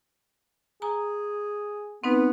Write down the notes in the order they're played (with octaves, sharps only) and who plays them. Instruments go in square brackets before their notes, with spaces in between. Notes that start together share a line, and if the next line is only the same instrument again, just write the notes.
[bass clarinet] G#4 [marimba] A#5
[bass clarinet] B3 [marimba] C4 D#4 B4